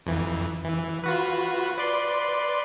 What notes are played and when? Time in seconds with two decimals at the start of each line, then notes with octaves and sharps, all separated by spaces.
0.06 F2 E3
0.64 E3
1.04 F4 F#4 B4
1.78 B4 D5 C6